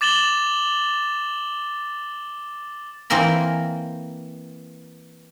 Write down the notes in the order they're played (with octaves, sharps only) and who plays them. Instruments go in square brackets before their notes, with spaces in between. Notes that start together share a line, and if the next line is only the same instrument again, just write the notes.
[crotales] D6 A6 E7 F#7 G7
[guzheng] E3 A#3 C4 A#4 B5